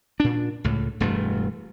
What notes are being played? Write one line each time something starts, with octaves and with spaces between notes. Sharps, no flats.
A#2 D4
C#2 A2
E1 G2 A3